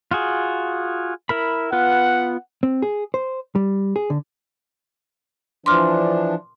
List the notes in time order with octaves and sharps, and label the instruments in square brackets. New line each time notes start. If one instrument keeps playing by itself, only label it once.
[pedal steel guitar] F4 F#4 G#4
E4 A#4 B5
[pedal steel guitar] B3 F4 B4 [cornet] F#5
[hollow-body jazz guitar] C4
G#4
C5
G3
G#4
D3
[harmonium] E3 F3 D4 [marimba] C6 D6 F6